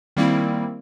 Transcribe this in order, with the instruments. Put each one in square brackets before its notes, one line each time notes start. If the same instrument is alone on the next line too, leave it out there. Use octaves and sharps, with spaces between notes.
[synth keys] D#3 G3 A#3 C4 E4